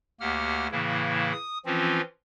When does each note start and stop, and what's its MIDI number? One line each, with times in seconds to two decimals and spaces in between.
0.20 0.67 38
0.20 0.67 58
0.20 0.67 67
0.20 0.67 78
0.20 0.67 89
0.72 1.32 45
0.72 1.32 49
0.72 1.32 52
0.72 1.32 58
0.72 1.32 64
1.32 1.58 87
1.66 2.01 52
1.66 2.01 53
1.66 2.01 60
1.66 2.01 61
1.66 2.01 65